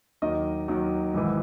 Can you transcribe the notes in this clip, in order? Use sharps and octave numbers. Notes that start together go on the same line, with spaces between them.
D#2 D#3 F#3 D#5
D#2 D#3 F#3
G#1 G#2 E3